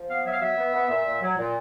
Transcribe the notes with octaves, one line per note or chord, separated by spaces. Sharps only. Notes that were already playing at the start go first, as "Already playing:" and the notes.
Already playing: F3
B3 F5
F#3 E5
F5
F#3 E5
B3
B3
A#2
A#2
F#3
A#2